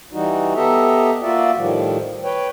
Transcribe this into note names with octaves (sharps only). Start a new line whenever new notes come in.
E3 G3 D#4 F#4
B3 G4 A4 D#5 E5 A#5
A#3 F4 F#4 D5 E5
A2 D#3 F3 G3
B4 C#5 G5